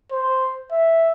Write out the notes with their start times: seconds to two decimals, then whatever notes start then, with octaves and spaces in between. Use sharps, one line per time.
0.12 C5
0.72 E5